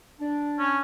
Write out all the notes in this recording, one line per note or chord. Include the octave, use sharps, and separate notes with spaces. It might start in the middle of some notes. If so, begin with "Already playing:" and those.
D4
C#4